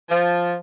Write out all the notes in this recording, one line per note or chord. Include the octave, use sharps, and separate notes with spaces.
F3